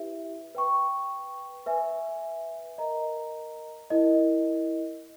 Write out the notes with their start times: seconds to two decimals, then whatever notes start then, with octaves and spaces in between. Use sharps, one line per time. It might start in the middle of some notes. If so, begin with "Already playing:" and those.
Already playing: E4 G4 B4 E5
0.55 B4 G5 C#6
1.66 B4 E5 G#5
2.78 A#4 D#5 A#5
3.90 E4 A#4 D#5